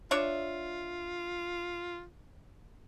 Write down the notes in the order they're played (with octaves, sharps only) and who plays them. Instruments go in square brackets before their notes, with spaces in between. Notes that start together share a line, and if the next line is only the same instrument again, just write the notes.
[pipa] D4 C#5 E5 [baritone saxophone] F4